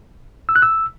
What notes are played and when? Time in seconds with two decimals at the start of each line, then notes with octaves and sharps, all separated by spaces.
0.49 E6
0.56 F#6
0.62 E6